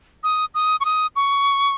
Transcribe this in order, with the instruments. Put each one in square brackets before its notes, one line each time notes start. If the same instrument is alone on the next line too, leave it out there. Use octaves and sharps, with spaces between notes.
[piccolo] D#6
D#6
C#6
D#6
C#6